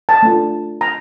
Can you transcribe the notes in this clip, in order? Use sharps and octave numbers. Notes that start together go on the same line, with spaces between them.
A5
A3 D4 F4
A#5